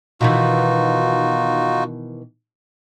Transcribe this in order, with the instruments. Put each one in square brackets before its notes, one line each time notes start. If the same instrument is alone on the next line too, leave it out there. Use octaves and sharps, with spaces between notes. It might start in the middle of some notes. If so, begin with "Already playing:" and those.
[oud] B2 D#3 E3 [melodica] D#4 F4 F#4